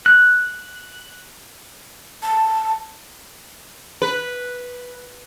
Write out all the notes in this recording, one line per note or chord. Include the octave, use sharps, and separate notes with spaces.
F#6
A5
B4